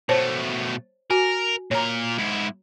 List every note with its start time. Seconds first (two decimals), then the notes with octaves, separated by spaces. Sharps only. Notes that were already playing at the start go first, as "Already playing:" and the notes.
0.09 B2 A3 C5 C#5 A5
1.10 F#4 A#4 G#5
1.71 A#2 A#4 C#5 A#5
2.19 G#2 E4